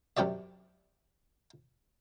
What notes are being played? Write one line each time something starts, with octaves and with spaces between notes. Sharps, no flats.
F#2 C3 G4 D5 E5